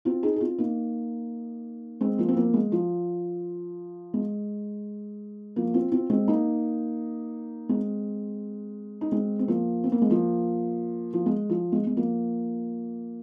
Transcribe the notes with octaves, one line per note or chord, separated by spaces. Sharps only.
C4 F4
D#4 G#4
G#4
C4 F4
A#3 D#4
G#3 C4
F3 A#3
C4
F3 A#3
G#3
F3
G#3
F3 A#3
C4 F4
C4 F4
G#3 C4
A#3 D#4
G#3 C4
D#4
G#3 C4
C4
F3 A#3
C4
A#3
G#3
F3 A#3
F3
G#3
F3
G#3
G#3
F3 A#3